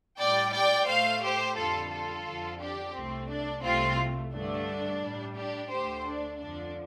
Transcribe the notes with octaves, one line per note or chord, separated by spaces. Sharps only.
A2 G3 D5 G5
D5 G5
A2 A3 C5 F5
G4 C5
F2 D3 G3 F4 A4
F4 A4
F2 D3 F3
D4 G4
C2 C3 A3 C4
D4
C2 C3 A3 C4 F4
G2 D3 A3 D4
A2 G3
D4 G4
D2 D3 A3 G4 C5
D4
F2 D3 F3 D4